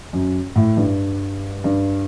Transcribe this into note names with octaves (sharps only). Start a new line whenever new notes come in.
F#2
A2
G2
G2